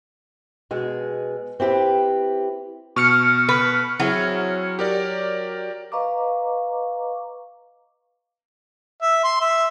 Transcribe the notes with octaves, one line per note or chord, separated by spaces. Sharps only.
B2 G#3 G#4
C4 E4 G4 B4
B2 C#6 F6 C#7
B4
F#3 C4 E4 G#4
G4 A#4 D5
B4 D#5 F5 A#5 C#6 D6
E5
C6
E5